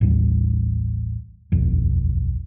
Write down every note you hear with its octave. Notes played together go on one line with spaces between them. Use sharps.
A1 D#2 G3
D#1 B1 F2